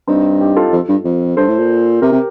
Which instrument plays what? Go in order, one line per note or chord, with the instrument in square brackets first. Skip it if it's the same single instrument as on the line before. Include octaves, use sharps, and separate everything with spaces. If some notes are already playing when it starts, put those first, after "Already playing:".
[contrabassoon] G2 [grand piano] C4 D#4
[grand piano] D#4 G4
F4 A4
[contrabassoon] F2
G2
F2
[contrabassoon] G2 [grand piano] A4 C5
[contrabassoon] A2
A#2
[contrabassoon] C3 [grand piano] G4 A#4
[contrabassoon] C3